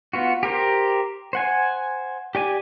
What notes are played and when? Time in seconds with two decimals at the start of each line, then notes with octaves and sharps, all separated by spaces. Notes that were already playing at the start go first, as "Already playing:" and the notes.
0.13 B3 F4 F#4
0.43 G4 A#4 C5
1.33 C5 F#5 G#5
2.35 G4 D5 G#5